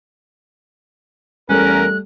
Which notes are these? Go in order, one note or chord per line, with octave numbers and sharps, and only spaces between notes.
E2 G3 A3 C#4 A#4 F#6